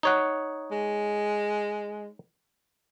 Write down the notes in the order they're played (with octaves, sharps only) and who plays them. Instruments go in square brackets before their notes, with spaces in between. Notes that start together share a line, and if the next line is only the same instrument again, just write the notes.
[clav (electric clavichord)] D#4 C#5 F#5
[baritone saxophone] G#3